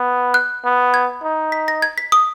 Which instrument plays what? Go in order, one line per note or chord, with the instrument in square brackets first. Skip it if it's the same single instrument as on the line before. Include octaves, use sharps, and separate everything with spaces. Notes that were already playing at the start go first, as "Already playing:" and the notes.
Already playing: [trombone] B3
[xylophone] F#6
[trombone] B3
[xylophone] G#6
[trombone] D#4
[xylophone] B6
A#6
G#6
B6
D#6